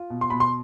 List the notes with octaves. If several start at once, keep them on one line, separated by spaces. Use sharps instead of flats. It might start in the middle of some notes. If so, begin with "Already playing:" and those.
Already playing: F4
B2
C6
B2 B5
C6